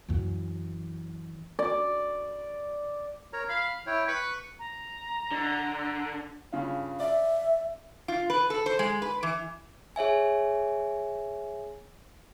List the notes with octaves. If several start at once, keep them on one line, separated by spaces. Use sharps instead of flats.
F#2 E3
D5
A#4 C#5 A#5
F5 B5
E4 C#5 G5
B4 C#6
A#5
D3
G2 C#3 F4
D5 E5
F4
B4
A4
C5
G#3
B4
E3
G#4 C#5 E5 G#5